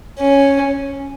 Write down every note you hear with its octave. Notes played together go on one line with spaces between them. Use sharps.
C#4